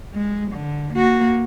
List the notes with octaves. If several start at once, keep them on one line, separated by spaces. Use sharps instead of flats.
G#3
D3
A#3 F#4